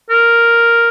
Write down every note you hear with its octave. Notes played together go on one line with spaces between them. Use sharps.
A#4